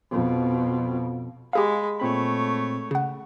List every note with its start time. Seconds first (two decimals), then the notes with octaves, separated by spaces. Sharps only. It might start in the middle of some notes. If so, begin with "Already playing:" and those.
0.11 F2 B2
1.53 G#3 G4 G#4 F5 B5
2.00 A#2 A3 C4 C#5 B5
2.91 C#3 F#5